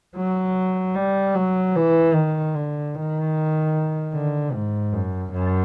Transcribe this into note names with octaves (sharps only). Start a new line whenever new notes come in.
F#3
G3
F#3
E3
D#3
D3
D#3
D3
G#2
F#2
F#2